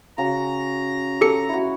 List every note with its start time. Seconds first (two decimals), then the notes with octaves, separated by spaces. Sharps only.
0.18 C#3 F#4 A#5
1.21 G4 A4 C#7
1.49 E4 F#4